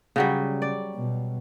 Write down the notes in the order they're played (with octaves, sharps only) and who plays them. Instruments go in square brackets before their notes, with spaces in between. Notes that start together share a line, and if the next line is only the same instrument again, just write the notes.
[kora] C#3 F#3 G3
D5
[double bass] B2